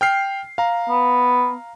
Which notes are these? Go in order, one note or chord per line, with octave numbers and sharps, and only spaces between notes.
G5 F6 C7
F5 A#5
B3